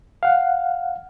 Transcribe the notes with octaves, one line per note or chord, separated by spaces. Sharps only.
F5 F#5